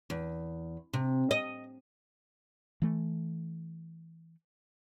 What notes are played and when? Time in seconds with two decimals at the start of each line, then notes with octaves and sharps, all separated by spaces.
0.10 E2
0.93 C3
1.31 D#5
2.82 E3 A3